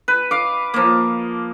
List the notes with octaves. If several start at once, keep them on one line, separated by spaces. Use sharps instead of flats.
B4
F5 D6
F3 A#3